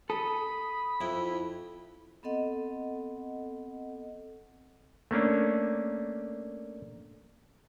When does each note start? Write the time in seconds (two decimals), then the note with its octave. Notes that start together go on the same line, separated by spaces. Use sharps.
0.10 A4 B5 D#6
1.01 F2 E4
2.23 B3 C4 A4 D#5 F#5
5.11 A3 A#3 C#4 D4